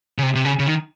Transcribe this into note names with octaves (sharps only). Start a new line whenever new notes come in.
C#3
C3
C3
C#3
C#3
D#3